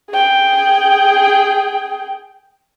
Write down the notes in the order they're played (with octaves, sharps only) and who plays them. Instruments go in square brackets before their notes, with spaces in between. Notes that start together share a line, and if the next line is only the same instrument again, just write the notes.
[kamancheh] G#4 G5